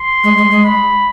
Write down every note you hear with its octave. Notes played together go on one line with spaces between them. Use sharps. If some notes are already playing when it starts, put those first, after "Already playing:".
Already playing: C6
G#3
G#3
G#3
B5